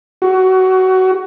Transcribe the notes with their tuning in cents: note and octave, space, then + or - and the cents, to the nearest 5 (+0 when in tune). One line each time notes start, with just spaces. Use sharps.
F#4 +20